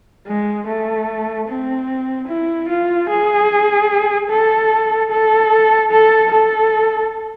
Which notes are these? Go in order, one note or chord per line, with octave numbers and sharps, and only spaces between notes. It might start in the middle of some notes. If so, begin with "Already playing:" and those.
G#3
A3
C4
E4
F4
G#4
A4
A4
A4
A4